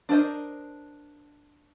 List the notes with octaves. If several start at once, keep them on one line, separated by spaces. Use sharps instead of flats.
D4 A#4 C5 D#5